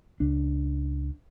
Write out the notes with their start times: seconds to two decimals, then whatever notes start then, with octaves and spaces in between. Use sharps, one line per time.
0.20 C#2 D4